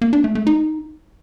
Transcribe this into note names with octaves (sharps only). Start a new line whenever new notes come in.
A#3
D4
A3
A3
D#4